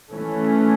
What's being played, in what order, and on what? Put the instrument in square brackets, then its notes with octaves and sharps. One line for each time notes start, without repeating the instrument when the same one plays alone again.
[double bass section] E3 A3 C#4